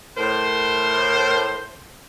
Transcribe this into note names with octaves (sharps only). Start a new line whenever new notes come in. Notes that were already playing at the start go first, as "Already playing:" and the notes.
A2 A#4 C5